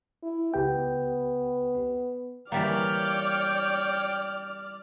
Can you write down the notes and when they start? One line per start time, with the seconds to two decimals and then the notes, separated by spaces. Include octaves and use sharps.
0.23 E4
0.54 C#2 B3 G4 G5
2.52 E3 G3 A#3 C#5 D5 G5 F6